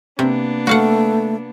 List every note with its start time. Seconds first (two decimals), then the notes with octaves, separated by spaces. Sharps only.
0.19 C3 A#3 B3 D4
0.67 A3 F#4 F5 F#5